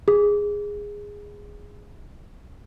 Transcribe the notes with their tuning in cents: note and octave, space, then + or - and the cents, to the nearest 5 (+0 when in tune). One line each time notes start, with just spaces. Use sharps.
G#4 -10